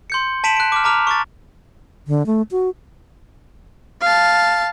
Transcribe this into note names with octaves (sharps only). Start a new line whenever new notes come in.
C6 G6 C#7
A5 B6 D7 E7 F#7
F#6 D7
D6 F6
A5 A#5 D6 F6 F7
C#6 D6 A6
D3
A3
F#4
F5 A5